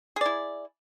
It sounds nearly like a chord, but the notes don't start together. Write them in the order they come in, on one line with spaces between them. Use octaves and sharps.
G#4 D5 E4